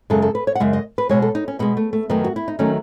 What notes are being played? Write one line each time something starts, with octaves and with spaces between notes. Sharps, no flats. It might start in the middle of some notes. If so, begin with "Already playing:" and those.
F#2 C#3 G#3 A4
A4
B4
C#5
F#5
F#2 C#3 G#3 E5
D#5
B4
B2 G#3 C#5
A4
D#4
C#4
B2 G#3 B3
A3
A3
F#2 D#3 F#3 A3 B3
F#4
E4
D#4
D#3 F#3 A3 C#4